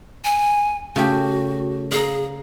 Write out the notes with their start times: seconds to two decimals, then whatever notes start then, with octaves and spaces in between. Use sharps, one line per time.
0.24 G#5
0.96 C#3 A3 F#4 G4
1.92 G#4 F5 A#5